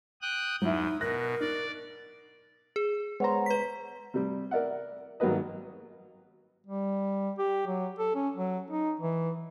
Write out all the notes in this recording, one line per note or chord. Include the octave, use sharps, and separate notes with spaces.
G5 D#6 F#6
E2 F#3 D#4 E4
B2 A#4 F#6 A#6
D#4 D5
G#4
G#3 B3 C5 C#5 A#5
B4 B6
C3 G3
A#4 D5 E5 F#5
G#1 F#3 G3 A#3 B4 D#5
G3
G4
F#3
A4
C#4
F#3
D#4
E3